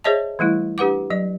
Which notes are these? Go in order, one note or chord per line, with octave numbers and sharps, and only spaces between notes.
G#4 C5 C#5 D#5 E5 A5
E3 G3 A3 E4
D4 G4 B4 F#5 D6
F#3 D#5